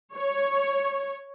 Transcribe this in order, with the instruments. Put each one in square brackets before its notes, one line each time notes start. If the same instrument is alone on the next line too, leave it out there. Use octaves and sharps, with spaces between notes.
[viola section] C#5